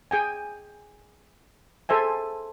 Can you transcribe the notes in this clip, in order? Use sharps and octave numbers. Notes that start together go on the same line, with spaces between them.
G#4 G5 G#5
G#4 A4 C5 E5 G#5